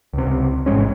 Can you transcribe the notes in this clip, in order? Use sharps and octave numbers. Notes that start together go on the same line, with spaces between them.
C#2 C3
A1 G#2 G#3 C#4